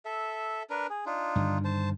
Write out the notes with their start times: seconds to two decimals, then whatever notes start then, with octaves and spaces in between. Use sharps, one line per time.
0.05 A4 E5
0.70 D4 A#4 B4
0.90 G#4
1.06 D4 D#4 F4
1.36 G2 D3 D#3
1.65 C5 A5